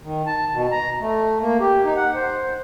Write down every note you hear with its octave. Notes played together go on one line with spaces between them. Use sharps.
D#3
A5
B2
A#5
A3
A#3
G4
D#4
F#5
C5